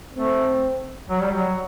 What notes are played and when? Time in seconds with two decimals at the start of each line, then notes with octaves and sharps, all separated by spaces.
0.16 A3 C4
1.09 F#3
1.21 G3
1.32 F#3